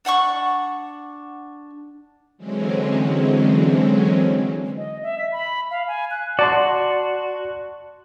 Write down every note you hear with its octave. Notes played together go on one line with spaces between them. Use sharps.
D4 F#5 G5 C#6
D3 E3 F#3 G#3 C4 C#4
D#5
E5
B6
B5
F5
G#5
F#6
F#4 D5 A5 C6